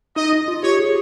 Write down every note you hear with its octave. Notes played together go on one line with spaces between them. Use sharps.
D#4 D#5
F4
G4 C#5
G#4